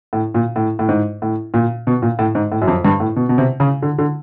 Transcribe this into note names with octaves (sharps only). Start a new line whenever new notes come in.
A2
A#2
A2
A2
G#2
A2
A#2
B2
A#2
A2
G#2
A2
F#2
F2
G2
A2
B2
B2
C3
C#3
D3
D3